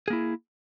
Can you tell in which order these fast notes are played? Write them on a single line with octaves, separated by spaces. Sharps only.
G#4 A#3 E4